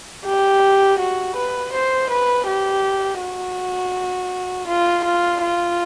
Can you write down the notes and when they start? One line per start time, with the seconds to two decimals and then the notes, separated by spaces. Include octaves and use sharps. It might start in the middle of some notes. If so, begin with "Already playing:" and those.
0.25 G4
0.99 F#4
1.36 B4
1.73 C5
2.10 B4
2.47 G4
3.20 F#4
4.68 F4
5.05 F4
5.42 F4